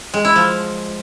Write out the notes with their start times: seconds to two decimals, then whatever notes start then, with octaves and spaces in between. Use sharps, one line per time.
0.14 G#3
0.25 E4
0.36 F3